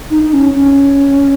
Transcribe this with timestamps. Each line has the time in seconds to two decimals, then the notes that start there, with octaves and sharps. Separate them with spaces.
0.11 D#4
0.22 D#4
0.33 C#4
0.55 C#4